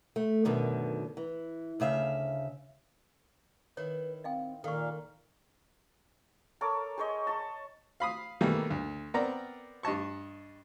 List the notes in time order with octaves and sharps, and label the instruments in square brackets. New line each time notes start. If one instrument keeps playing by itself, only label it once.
[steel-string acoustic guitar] A3
F#2 B2 D3 D#3
E3
D2 C#3 E5 F5
[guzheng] D#3 E4 [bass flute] B4 [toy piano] C#5
[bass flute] C4 [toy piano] D#5 F5 G5
[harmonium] A#2 A#3 F5 [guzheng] D#3 [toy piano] A4 C#6 [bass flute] D5
[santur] A4 A#4 C#5 D6
G#4 C5 C#5 D#5
A5 C#6
[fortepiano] F5 B5 D#6
B2 D#3 E3 G3 A3 A#3
D2
B3 C4 A#4 D5 A#5
G2 D#5 A5 C#6